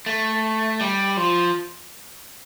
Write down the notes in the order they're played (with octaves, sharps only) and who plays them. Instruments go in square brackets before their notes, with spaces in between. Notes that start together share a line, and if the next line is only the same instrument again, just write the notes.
[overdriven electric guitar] A3
G3
F3